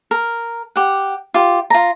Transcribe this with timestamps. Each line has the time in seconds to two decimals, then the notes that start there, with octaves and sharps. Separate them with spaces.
0.11 A#4
0.76 G4 F#5
1.34 F4 G4
1.70 F4 A#5